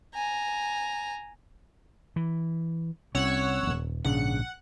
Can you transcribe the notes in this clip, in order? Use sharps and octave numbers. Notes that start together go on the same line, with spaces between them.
G#5 A#5
E3
C2 C4 C#4 C#5 F#5 E6
D#1 G#1
A#1 G#2 C#3 D4 F#5